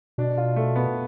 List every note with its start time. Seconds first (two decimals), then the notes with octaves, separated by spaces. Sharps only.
0.18 B2 D4
0.37 F4
0.56 A3
0.76 B3